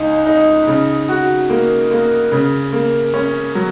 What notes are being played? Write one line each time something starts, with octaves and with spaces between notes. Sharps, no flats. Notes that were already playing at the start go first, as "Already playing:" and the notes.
Already playing: C#2 D#4
D#4
C#3
F#4
A#3
A#3
C#3
A#3
C#4
F#3